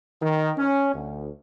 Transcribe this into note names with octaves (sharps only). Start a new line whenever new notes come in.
D#3
C#4
D2